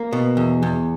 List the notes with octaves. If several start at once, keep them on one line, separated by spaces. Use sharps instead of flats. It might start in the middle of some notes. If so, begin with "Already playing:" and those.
Already playing: A#3
B2
E2
E2